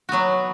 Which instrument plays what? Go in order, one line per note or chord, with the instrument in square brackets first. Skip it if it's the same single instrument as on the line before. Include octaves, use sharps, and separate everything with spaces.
[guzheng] F#3 B3 F#4